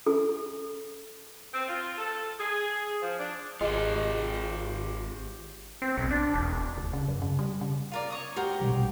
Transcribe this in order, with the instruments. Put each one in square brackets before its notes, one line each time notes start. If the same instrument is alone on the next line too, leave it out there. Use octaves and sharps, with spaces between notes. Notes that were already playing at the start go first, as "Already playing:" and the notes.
[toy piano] A4
[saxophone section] C4
F4
A4
G#4
F3
D4
[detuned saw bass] G#1 [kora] G#3 [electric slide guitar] F4 G4
[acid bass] C4
B1
D4
E1
[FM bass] D2
C#3
F#2
C#3
G3
C#3
[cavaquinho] F4 A#4 D5
C#5 C#6 D#6
[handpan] G#3 G4 [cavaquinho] F#4 A#4 C5
[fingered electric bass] A#1 B2 G3